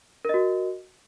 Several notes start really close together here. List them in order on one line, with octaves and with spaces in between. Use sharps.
A#4 D#5 F#4